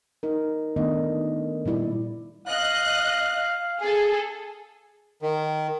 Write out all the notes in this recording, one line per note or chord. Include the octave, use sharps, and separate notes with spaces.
D#4 A#4
D#3 A3 B3 D4 D#5
A#2 G3 E4 D5
D#5 F5 F#6
G#4 A4
D#3